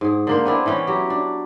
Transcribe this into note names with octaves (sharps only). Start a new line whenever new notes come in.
G#2 G#4
D3 A#3 C5
B3 C4 D4 E4
E3 B3 C#4 G5
F#3 G4
D4